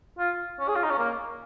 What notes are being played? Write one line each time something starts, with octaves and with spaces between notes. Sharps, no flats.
F4
C#4
G#4
F4
D#4
C#4
A#3